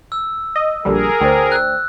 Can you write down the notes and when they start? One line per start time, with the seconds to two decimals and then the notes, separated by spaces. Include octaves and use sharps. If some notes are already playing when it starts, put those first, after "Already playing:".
0.12 E6
0.56 D#5
0.85 A#1 D3 G3 G#4 A#4
1.21 D2 C5 D5 G5
1.52 E6 F#6